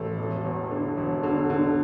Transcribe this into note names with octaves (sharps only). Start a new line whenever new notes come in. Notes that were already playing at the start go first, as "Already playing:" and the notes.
Already playing: A1 A4
E1
E2
D3
E1
D3
D3